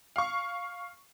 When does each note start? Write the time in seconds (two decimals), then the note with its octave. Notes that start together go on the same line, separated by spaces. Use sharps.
0.16 F5 C#6